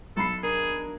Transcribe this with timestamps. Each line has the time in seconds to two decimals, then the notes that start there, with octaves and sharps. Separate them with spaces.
0.17 B1 A4 B5 C7
0.43 D4 G#4 A#4